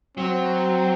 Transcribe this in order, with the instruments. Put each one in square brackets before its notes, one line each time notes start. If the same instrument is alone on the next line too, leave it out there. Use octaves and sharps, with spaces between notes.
[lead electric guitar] F#3 [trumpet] C4